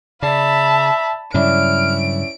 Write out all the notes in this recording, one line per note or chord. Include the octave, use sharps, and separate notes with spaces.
C#3 D5 E5 A5 B5
G2 C#3 F#3 C#4 E4 D5 F6 D7